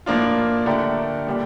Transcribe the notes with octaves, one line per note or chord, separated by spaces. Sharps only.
A2 F3 A#3 D4 F4
D3 A3 D4 G4 A#4
A#2 G3 D4 G4